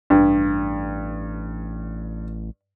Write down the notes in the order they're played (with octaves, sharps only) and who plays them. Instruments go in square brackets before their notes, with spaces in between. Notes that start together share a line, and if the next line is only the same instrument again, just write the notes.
[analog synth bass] A1 [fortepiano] G2